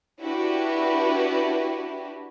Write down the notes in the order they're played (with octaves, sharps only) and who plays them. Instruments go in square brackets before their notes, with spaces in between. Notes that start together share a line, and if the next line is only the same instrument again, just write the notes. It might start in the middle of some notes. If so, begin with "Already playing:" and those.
[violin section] D4 E4 F#4 G4 B4